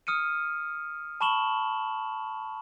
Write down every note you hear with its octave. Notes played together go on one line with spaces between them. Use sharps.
D#6 F6 C#7 D#7
A5 B5 C#6 E7 F#7 G7